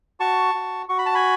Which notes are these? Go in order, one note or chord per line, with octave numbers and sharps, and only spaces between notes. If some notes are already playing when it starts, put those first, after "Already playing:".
F#4 A5 C#6
F#4
F#4 C#6
B5
A5
G#5 B5